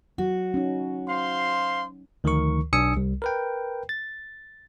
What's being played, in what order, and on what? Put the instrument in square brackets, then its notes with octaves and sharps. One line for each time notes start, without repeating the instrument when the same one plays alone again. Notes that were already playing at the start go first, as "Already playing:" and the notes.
[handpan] F#3 [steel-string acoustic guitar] F#4
[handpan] C#4 D#4
[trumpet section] C5 F5 C6
[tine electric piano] D2 D#3 F3 A#4 C#6
B1 D4 G#5 D#6 E6 C#7
C2 G3
A#4 B4 G5
A6